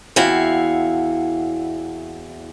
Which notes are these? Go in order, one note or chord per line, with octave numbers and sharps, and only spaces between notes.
E2 C4 E4 F#4 F5